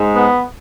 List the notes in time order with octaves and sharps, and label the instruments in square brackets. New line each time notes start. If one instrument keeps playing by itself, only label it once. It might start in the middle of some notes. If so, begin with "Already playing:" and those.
Already playing: [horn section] G#2 G#3
B3